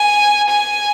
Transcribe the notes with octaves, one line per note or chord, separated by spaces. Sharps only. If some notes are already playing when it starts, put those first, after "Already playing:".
Already playing: G#5
G#5